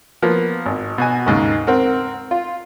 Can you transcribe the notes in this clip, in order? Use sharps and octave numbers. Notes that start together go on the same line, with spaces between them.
F3 A#3 B3
G#1
B2 F#4 G#5
D#2 G#2 C#3
C4 A#4 F#5
F4